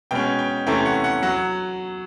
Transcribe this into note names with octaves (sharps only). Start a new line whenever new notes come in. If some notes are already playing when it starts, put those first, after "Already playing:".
B2 G#3 C#4 G5
G5
C3 E3 A3 C#4 G5
F#5
F#5
F#3 F#5